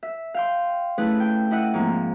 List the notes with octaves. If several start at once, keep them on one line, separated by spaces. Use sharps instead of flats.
E5
F5 G5 C6
A3 C#4 E4 G#4 B4
G5
E4 D#5 E5 F#5
G#2 F3 A#3 C4